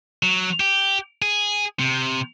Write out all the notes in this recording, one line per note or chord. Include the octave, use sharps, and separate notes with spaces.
F#3
G4
G#4
C3